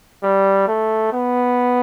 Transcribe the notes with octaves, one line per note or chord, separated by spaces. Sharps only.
G3
A3
B3